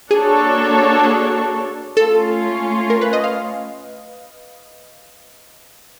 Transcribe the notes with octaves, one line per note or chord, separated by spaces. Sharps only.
A#3 D4 F#4 G#4 A4 C#5
G#4
A3 C#4 F4 A4
A#4
B4
D#5
F5